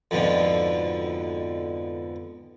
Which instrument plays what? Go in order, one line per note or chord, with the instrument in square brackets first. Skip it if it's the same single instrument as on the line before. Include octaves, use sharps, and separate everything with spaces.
[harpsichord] F2 G#2 B2 D3